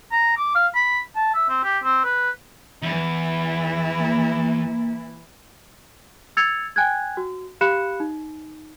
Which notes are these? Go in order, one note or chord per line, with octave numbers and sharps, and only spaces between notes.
A#5
D6
F5
B5
A5
E5
C4
G4
C4
B4
E2 E3 E4
A#3
E6 G#6 A6 C#7 F7
G5 G#5 F#6 G#6
F#4
G4 F5 B5 F#6 C#7 E7
D#4